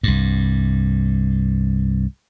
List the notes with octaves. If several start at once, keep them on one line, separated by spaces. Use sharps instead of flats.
C2 G2